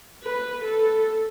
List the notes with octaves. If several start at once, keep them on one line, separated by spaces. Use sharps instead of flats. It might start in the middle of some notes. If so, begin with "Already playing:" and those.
B4
A4